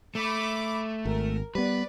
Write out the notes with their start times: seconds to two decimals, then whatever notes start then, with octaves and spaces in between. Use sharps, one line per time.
0.15 A3 B5 D6
1.05 G#1 A#4
1.55 G3 B3 B4 D5